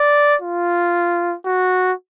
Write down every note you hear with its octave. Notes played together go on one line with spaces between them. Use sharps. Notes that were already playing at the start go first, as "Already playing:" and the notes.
Already playing: D5
F4
F#4